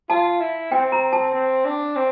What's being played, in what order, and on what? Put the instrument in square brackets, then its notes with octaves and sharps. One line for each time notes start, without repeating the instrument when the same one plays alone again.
[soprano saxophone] F4 [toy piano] A5
[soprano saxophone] E4
[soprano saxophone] C4 [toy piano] G5
[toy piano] A#5
A5
[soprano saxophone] C4
D4
C4